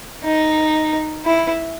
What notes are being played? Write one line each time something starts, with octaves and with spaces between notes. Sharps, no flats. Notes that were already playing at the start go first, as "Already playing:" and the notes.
D#4
E4